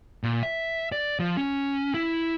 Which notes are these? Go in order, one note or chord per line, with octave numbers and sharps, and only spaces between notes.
A#2
E5
D5
F3
C#4
E4